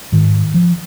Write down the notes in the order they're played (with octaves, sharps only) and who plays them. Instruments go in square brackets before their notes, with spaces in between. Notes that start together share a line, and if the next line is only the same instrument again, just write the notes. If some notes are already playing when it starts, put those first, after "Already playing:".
[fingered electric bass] G#2 D#3
F3